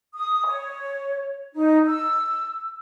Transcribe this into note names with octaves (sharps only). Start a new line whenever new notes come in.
D#6
C#5
D#4
E6